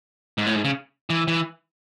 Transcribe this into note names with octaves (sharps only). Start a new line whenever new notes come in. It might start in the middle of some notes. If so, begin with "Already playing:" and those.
G#2
A2
G#2
C#3
E3
E3